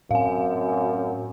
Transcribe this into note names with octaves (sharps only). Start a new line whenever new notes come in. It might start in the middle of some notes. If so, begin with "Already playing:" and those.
F#2 A2 C4 F5 G#5